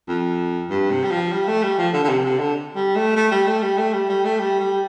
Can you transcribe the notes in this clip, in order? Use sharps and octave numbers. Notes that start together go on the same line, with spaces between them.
F2
G2
C3
G3
F3
G3
A3
G3
F3
D3
D3
C3
C3
D3
G3
A3
A3
G3
A3
G3
A3
G3
G3
A3
G3
G3